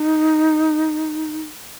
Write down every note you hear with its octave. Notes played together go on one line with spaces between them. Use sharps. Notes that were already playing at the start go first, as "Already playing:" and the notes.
Already playing: D#4